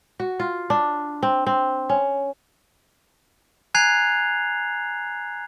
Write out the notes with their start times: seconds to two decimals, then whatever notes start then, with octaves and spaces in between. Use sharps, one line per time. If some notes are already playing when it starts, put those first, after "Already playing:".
0.20 F#4
0.40 F4
0.70 D4
1.23 C4
1.47 C4
1.89 C#4
3.74 G#5 A#5 F#6 G#6 C7 F7